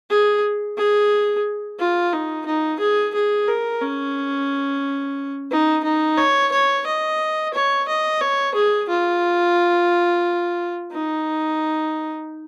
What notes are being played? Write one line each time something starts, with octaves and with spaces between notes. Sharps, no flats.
G#4
G#4
F4
D#4
D#4
G#4
G#4
A#4
C#4
D#4
D#4
C#5
C#5
D#5
C#5
D#5
C#5
G#4
F4
D#4